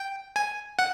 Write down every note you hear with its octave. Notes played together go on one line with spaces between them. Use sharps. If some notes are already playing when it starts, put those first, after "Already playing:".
Already playing: G5
G#5
F#5